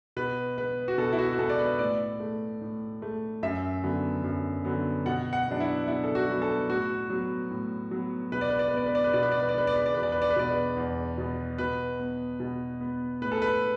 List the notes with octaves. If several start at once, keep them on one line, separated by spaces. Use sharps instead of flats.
B2 B4
B3 B4
F#4
B2 A4
E4
F#4
F#4
B3 A4
D5
B4
A2 D5
A3
A2
A3
F#2 E5
D3 F#3 B3
F#2
D3 F#3 B3
B2 F#5
F#5
F#3 B3 D4
E4
B2 E4
A4
F#4
F#3 B3
A4
A2 F#4
F#3 B3
A2
F#3 B3
B2 B4
D5
B4
D5
B4
B3 D5
B4
D5
B4
B2 D5
B4
D5
B4
D5
B3 B4
D5
B4
D5
E2 B4
D5
B4
D5
B4
B2 B3 D5
B4
E2
B2 B3
B2 B4
B3
B2
B3
A2 B4
A4
B4